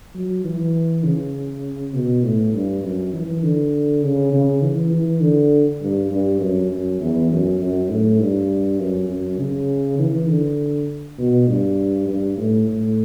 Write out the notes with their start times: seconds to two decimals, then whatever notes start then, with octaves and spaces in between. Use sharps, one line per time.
0.15 F#3
0.44 E3
1.04 C#3
1.94 B2
2.24 A2
2.53 G2
2.83 F#2
3.13 E3
3.43 D3
4.03 C#3
4.32 C#3
4.62 E3
4.92 E3
5.21 D3
5.81 G2
6.11 G2
6.41 F#2
6.71 F#2
7.00 E2
7.31 F#2
7.61 F#2
7.90 A2
8.21 G2
8.80 F#2
9.09 F#2
9.39 C#3
9.99 E3
10.29 D3
11.18 B2
11.48 G2
12.07 G2
12.38 A2
12.68 A2